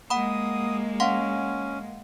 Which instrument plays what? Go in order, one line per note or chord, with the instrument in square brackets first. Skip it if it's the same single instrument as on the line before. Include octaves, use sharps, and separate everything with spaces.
[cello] G#3 A#3 [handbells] F#5 B5 [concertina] D#6
[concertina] C#4 [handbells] F5 F#5 C6